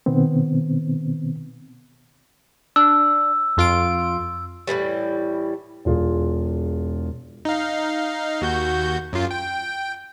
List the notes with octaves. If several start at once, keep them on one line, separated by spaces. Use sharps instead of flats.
B2 D#3 B3 C4
D4 E6
F2 F4 D7
A2 C3 E3 G3
E1 F4 G#4
D#4 F5
D#2 F#4 G6
F#2 F4
G5